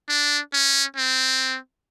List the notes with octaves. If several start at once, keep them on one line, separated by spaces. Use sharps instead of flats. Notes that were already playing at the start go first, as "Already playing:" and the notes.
D4
C#4
C4